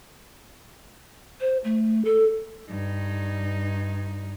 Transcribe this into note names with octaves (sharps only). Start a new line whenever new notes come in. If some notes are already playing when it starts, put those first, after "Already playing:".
C5
A3
A4
G2 D#4